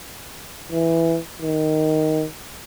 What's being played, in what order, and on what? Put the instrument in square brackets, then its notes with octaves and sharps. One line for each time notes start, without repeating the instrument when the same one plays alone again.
[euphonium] E3
D#3